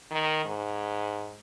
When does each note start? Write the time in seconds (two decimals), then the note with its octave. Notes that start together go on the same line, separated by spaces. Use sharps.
0.11 D#3
0.45 G#2